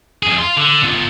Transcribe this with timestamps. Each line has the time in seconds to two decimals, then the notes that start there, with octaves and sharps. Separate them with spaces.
0.23 F2 G#4
0.39 F5 C6
0.57 D3
0.84 B3 F4